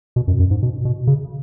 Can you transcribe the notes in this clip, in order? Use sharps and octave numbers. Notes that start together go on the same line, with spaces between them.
B2
F#2
F#2
G#2
B2
B2
C#3